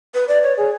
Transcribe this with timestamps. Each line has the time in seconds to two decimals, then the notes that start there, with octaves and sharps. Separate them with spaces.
0.14 B4
0.28 D5
0.43 C#5
0.57 G#4